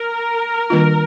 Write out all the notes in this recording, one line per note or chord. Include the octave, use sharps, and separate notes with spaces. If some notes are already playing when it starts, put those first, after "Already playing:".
Already playing: A#4
D#3 G3 A#3 D4 F4